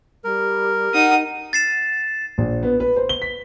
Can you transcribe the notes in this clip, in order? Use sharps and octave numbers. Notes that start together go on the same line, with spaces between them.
G3 A#4
D#4 F#5 D#6
A6 C7 E7
A#1
B3
B4
C5
G7
B6